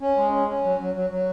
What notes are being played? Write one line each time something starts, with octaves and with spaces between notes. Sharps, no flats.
C#4
G#3
C#4
C#4
F#3
F#3
F#3
F#3